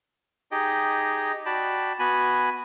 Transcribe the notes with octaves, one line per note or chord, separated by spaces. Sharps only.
D#4 G4 G#4 D#5 G5
F#4 D5 G5 A5 B5
B3 F#4 G#5 B5